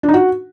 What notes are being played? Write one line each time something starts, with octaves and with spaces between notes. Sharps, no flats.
D4
D#4
F#4